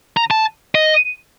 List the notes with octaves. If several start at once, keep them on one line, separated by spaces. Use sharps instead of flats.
A#5
A5
D#5